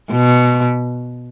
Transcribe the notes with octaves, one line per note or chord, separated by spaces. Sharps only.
B2